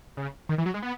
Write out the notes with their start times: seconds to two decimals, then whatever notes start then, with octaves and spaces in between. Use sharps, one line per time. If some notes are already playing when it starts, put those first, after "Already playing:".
0.17 C#3
0.49 D#3
0.58 E3
0.66 F#3
0.74 G#3
0.82 B3